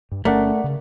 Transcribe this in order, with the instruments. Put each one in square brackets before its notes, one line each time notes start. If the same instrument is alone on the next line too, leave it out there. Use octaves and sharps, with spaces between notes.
[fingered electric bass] G2
[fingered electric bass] G1 C#4 [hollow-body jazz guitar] A3 [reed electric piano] A#4 D5 F#5
[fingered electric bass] C#3